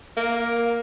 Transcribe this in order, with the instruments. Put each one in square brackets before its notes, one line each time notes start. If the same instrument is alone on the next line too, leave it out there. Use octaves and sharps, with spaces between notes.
[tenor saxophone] A#3